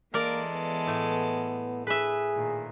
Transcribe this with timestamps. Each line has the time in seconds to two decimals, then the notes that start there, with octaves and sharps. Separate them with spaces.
0.14 E3 G#3 A#3 A4 A#4 D5
0.52 B3
0.87 A2
1.87 G#4 B4 E5
2.36 A#2 D#3